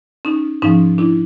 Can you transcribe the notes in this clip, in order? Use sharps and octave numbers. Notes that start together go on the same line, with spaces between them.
C#4 D#4
G#2 F3 C#4 D#4
D4 E4